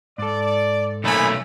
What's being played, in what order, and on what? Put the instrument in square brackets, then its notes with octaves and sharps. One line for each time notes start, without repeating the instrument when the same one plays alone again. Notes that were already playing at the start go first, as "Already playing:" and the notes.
[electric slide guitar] G#2 A4 [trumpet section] D5
[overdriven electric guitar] B1 A3 [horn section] A#2 G#5 B5 [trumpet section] C4 D#4 C#5